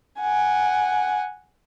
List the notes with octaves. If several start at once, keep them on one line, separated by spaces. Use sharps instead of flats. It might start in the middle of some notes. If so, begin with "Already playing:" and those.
F#5 G#5